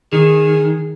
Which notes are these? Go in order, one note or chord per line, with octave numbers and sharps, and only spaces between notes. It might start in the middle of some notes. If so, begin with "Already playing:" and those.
D#3 G#4